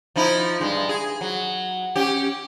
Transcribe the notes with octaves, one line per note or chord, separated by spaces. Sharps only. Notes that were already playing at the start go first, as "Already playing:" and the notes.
F3 D#4 E4
G2 G#3
G#4
F#3
C#4 G4